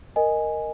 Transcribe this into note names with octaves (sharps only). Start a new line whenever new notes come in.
A#4 D#5 G#5